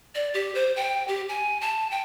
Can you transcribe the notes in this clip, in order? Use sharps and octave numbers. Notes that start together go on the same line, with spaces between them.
D5
G4
C5
G5
G4
G#5
A5
G5